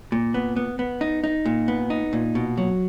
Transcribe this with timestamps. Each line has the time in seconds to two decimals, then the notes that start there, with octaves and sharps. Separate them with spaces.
0.12 A#2
0.34 B3
0.56 B3
0.79 B3
1.01 D#4
1.24 D#4
1.45 A#2
1.68 B3
1.90 D#4
2.13 A#2
2.35 B2
2.57 F#3